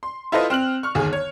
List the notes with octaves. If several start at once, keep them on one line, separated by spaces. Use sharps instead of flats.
C6
E4 F4 A4 B4 C5 D#5
C4 F6 F#6 F#7
C#6 F6
G1 D#2 G#4
C#5